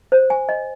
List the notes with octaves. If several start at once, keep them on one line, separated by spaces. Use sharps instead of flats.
C5
G#5
D#5